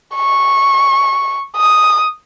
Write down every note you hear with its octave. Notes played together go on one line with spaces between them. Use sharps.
C#6
D#6